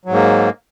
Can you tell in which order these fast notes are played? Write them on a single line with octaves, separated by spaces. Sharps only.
F#3 G#2 A#3